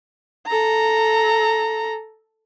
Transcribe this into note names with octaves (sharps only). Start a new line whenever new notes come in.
A4 A#5